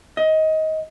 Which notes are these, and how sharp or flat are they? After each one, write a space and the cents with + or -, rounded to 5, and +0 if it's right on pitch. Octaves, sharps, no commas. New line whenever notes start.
D#5 +20